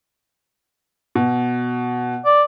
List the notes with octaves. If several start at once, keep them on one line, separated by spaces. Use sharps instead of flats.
B2
D5